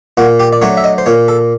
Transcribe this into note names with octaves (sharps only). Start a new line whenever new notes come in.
A#2 F#4
G4
D5
F#3 A3 D4 C#5
E5
D#5
C5
A#2 C#5
A4